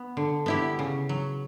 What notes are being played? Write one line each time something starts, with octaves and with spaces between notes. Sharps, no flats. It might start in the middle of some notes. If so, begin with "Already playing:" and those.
Already playing: B3
D3
B3 E4 G4
C#3
F#3